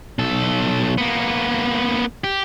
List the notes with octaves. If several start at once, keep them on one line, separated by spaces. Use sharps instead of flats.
B1 A4
A#3 B3
G4